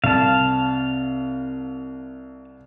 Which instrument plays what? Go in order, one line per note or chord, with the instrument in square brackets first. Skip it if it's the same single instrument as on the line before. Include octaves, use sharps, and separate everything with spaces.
[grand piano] C2 [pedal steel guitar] F5 A5